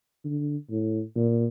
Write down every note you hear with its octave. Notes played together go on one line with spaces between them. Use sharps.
D3
A2
A#2